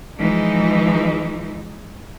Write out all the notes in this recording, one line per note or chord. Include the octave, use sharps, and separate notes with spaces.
E3 F3 G#3 D#4